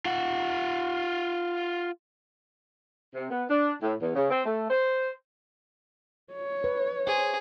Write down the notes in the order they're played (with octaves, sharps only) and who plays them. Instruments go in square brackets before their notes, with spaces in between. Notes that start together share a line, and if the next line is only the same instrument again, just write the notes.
[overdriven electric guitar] F4 F#5
[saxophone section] C3
B3
D4
A2
E2
C#3
C4
A3
C5
[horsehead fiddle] C#5
[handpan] B4
[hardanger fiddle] G#4 [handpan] C5